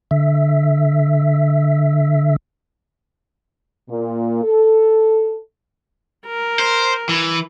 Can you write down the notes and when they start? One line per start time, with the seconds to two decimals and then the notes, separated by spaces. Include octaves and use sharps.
0.11 D3 E5
3.89 A#2
4.44 A4
6.27 A#4
6.59 C5
7.09 E3